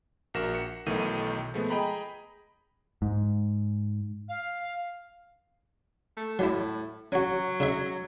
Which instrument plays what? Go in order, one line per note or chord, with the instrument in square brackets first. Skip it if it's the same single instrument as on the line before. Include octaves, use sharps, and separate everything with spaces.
[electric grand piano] A#1 F#4 A#4 A#6 E7
F#5 C#7
B1 D#3 E3 A3 D#7
F3 G#3 A3 B3
G#4 D#5 G5 A#5 B5
[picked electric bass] G#2
[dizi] F5
[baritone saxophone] A3
[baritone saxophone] A2 [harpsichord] F#3 E4
[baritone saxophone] F#3 [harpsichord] C#4 F#4
[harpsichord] C#3 D#4 E5